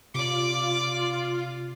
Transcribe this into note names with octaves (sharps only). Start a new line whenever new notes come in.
C3 F4 D5 D6